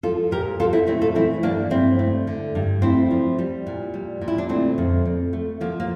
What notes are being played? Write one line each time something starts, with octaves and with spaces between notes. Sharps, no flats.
F3 F4 A4
A#2 G4 A#4
A#2 F4 A4
C4 E4
A3 C4 E4
F4 A4
E3 C4 E4
G2 A#3 D4
G2 C4 E4
A3
D3
G2
A3 C4 E4
F3
G3
A#2
G3
A#2
E4
D4
D3 A3 C4
F2
F2
A3
F3 A#3
A#3